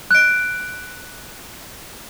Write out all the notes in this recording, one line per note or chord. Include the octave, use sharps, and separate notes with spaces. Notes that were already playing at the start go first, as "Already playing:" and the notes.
F#6 D7